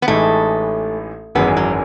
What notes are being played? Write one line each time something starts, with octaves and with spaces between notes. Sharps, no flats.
B3
A1 A2 E3 G#3 A3 D#4
G#1 F#2 E3 G#3 B3
F#3